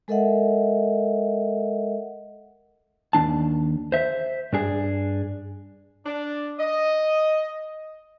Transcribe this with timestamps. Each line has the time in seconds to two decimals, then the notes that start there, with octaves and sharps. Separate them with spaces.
0.08 G#3 A4 A#4 D#5 E5 F#5
3.13 D#2 F3 D4 A5
3.92 C5 E5
4.53 G2 D4 G#4
6.06 D4
6.59 D#5